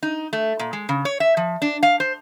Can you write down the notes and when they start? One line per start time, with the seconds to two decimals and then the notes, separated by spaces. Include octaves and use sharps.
0.03 D#4
0.33 A3
0.59 A#2
0.73 G#3
0.89 C#3
1.05 C#5
1.20 E5
1.37 F3
1.62 D4
1.83 F5
2.00 C5